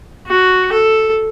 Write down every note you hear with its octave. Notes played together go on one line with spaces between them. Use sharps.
F#4
A4